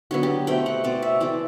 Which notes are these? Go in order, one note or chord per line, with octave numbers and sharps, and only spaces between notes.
D3 F#3 B3 F#4
G4
B2 A3 C4 G5
F#5
B2 A3 C4 D5
E5
E3 A3 C4 D5